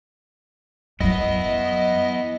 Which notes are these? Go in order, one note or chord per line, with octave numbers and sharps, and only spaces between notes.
F#2 F#3 B3 E4 D#5